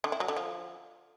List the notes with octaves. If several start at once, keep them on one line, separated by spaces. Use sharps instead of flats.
D3
E4
F#3
D3
F3